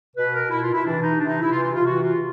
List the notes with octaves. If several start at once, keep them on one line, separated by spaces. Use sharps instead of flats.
B2 B4
A#4
B2 E4
F4
E4
C3 E3 D4
D#4
C3 E3 D4
D#4
E4
C3 E3 F4
F4
F4
C3 E3 F#4
F4